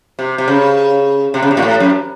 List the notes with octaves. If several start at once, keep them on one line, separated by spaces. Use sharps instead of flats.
C3
C3
C#3
C3
C#3
C3
A#2
A2
F#2